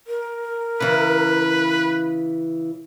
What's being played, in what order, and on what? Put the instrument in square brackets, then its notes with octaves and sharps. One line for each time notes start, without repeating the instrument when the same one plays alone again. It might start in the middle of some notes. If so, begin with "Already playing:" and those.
[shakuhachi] A#4
[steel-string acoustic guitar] C#3 E3 [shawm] B4